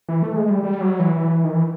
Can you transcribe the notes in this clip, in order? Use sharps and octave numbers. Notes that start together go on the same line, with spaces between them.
E3
A3
G#3
G3
G3
F#3
E3
E3
D#3
E3